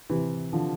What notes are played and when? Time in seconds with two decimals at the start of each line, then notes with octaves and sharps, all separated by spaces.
0.10 C3 E3
0.53 D3 F3